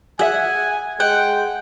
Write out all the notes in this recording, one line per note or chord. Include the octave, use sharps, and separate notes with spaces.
G#4 E5 F#5 G#5
G#3 F#5 G5